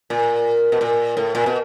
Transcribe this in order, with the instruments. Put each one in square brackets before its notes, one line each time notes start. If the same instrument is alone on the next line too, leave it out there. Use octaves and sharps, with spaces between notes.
[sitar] A#2
B2
A#2
A2
A#2
B2